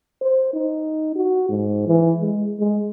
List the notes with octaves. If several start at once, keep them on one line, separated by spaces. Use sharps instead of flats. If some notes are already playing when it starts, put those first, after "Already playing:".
C5
D#4
F#4
G#2
E3
G#3
G#3